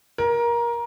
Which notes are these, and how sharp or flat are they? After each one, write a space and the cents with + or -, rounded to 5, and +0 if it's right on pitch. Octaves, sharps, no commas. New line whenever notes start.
A#4 +20